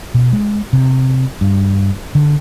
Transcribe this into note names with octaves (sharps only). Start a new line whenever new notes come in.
B2
G#3
C3
G2
D3